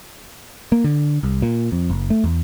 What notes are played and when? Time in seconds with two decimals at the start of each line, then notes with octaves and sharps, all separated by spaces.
0.72 A#3
0.84 D3
1.23 C2
1.42 A#2
1.72 F2
1.90 F#1
2.10 A3
2.24 E2